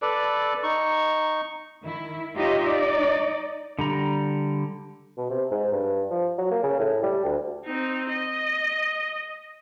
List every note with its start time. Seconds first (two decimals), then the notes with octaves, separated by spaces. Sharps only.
0.02 A4 B4 D5
0.63 D#4 C#6
1.83 D#3 E4
2.35 D#4 F4 G4 C#5 D#5 E5
2.64 D#4 D5 D#5
3.79 D3 G3 A#5
5.17 B2
5.30 C3
5.51 G#2
5.72 G2
6.10 F3
6.38 F#3
6.51 A#3
6.63 C#3
6.80 A2
7.03 G3
7.24 D2
7.65 C4 D#4
8.10 D#5